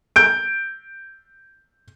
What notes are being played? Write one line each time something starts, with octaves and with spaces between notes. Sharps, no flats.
G6 D7